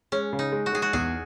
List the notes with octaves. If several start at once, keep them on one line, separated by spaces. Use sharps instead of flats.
G#3 C#4
C#3
D#4
G#3
F#4
G#3 G#4
F#4
E2 G#4